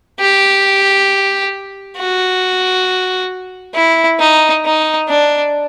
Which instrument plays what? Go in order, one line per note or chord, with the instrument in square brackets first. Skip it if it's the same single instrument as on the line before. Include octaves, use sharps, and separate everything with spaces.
[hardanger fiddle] G4
F#4
E4
D#4
D#4
D4